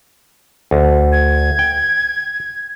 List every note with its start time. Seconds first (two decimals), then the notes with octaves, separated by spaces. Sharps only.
0.71 D2
1.12 G#6
1.59 G5